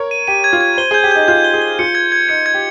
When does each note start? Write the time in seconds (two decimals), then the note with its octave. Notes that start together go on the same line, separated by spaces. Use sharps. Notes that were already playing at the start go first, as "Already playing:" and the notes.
Already playing: A#4 C#5
0.11 D#7
0.28 G4 D#7
0.44 G#6
0.53 F4
0.61 G#6
0.78 C5 G7
0.91 G#4 G6
1.04 G4
1.11 D#4 G6
1.28 F4 G6
1.44 G7
1.54 G#4
1.62 G7
1.79 F4 C#7
1.95 G#6
2.12 G#6
2.29 D#4 C#7
2.46 G#6
2.54 G4